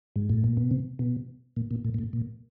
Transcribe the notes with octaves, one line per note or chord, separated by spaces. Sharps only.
G#2
A2
A#2
B2
C3
B2
A#2
A#2
A2
A#2
A2
A#2